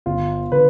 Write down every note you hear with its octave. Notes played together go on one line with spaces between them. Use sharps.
G1 F4
D3 B4